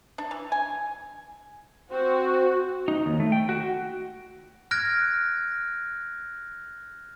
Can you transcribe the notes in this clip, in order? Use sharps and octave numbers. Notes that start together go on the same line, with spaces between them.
D4
E3
G#5
C4 F#4 C5
D#4
D#2
A3
G5
F#4
F6 F#6 G#6 A#6 D7